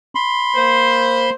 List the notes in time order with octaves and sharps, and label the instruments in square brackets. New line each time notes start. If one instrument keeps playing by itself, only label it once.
[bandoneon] B5 C6
[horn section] A#3 C5